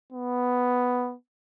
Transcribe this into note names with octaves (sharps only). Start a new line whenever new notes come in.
B3